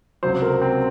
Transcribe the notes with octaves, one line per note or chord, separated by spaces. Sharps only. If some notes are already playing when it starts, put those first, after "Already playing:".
C#2 C3 F#3 C5
A#4
C4